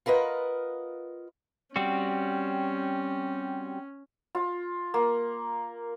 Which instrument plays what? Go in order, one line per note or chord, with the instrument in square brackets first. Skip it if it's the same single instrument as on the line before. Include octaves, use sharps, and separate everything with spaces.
[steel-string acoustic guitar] F4 A#4 B4 D#5 F#5
[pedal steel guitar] G3 C4 F#4 [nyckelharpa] C#4
[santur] F4
A#3